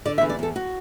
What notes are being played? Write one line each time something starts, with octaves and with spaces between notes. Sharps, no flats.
D3 D5
E5
E2
D5
E2 A4
F#4